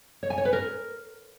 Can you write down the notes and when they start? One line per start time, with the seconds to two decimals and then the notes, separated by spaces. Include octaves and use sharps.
0.23 C#5
0.30 G#5
0.38 C#5
0.45 B4
0.53 A#4